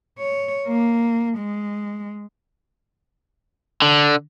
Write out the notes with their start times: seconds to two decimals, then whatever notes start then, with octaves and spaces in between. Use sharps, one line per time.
0.19 C#5
0.67 A#3
1.38 G#3
3.82 D3